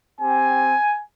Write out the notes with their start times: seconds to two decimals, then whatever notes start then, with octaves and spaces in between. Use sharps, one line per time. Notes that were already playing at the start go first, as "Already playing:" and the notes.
0.20 C4 G4 G#5